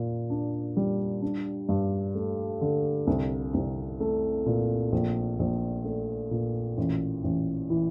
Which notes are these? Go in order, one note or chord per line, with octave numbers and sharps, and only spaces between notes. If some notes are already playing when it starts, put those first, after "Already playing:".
Already playing: A#2
D4
G3
D4
G2
A3
D3
C2
C2
A3
A#2
A#1
A#1
A3
A#2
A1
A1
E3